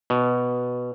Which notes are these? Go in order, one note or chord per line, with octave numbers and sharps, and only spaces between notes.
B2